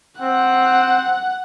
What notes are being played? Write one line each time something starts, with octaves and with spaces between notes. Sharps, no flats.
C4 F#5